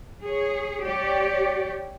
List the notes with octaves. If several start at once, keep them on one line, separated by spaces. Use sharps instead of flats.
G#4 C#5
G4 C#5 D5